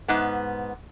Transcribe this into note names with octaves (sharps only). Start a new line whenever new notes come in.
G#2 B3